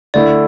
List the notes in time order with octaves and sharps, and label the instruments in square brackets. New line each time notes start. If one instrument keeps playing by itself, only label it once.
[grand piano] D3 A3 E4 A4 [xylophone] D5